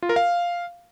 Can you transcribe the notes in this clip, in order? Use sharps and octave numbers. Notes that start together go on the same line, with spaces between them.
F4
A#4
F5